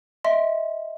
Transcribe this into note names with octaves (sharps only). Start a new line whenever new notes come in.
D#5 E5 C6